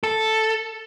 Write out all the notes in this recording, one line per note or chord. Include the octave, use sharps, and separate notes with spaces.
A4